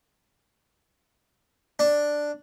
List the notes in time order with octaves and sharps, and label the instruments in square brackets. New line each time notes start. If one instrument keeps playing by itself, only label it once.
[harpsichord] D4